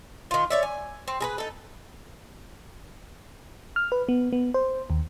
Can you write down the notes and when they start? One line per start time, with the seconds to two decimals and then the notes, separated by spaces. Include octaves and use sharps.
0.31 D#3 F4
0.50 C#5 D5 E5
0.63 G#5
1.08 C4
1.20 G#4 A#4 B4
1.38 D#4 A4
3.76 F6
3.92 B4
4.09 B3
4.33 B3
4.54 C5
4.90 D#2